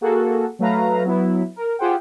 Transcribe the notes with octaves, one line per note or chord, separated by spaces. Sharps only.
A#3 F#4 G#4 A4
F#3 A3 B4 F5 A#5
F#3 B3 E4
A#4
F4 G4 G#4 C5 F#5 G5